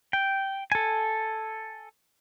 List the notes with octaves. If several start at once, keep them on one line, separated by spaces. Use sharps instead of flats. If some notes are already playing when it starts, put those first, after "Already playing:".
G5
A4 G#5